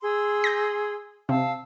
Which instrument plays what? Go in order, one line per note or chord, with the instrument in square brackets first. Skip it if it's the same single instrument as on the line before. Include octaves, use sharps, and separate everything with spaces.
[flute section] G#4 C6 E6
[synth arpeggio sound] G6 A#6
[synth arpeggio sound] C3 [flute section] F5 A5 E6